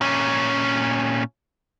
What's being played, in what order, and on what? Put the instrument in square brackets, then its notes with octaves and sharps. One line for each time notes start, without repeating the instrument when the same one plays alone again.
[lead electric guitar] A#2 C#4